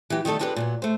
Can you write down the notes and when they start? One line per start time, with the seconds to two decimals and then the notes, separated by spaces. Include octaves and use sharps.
0.10 E3 F#3 G4
0.25 D#3 G3 A3 A4 D#5
0.39 F3 G#3 D4 G4 A4 B4
0.56 A#2 F#3 B3
0.82 A3 C5